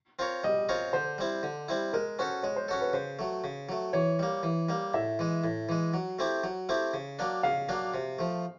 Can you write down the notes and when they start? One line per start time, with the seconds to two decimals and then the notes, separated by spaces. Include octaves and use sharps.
0.19 C4 F4 A#4 C#5
0.44 G3 D#5
0.69 C4 F4 A#4 C#5
0.93 D3 C5
1.18 G3 C4 E4
1.43 D3
1.68 G3 C4 E4
1.93 G#3 A#4
2.19 C#4 F#4 A4 C5
2.43 G#3 C#5
2.56 C5
2.68 C#4 F#4 A4 C#5
2.81 B4
2.93 C#3 C5
3.19 F#3 A3
3.44 C#3
3.69 F#3 A3
3.93 E3 C#5
4.19 G3 A#3
4.43 E3
4.69 G3 A#3
4.94 A2 E5
5.19 E3 G#3
5.44 A2
5.69 E3 G#3
5.94 F#3
6.19 A3 C4 E4 G4
6.44 F#3
6.69 A3 C4 E4 G4
6.94 C#3
7.19 F#3 A#3 D4
7.43 C#3 F5
7.69 F#3 A#3 D4
7.94 C3
8.19 F3 A3